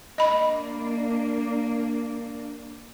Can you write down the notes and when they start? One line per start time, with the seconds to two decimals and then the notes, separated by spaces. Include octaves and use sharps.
0.18 A#3 D4 D#5 B5